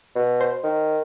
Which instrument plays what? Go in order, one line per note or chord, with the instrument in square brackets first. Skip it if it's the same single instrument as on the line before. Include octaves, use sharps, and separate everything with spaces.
[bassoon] B2
[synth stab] C5
[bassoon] D#3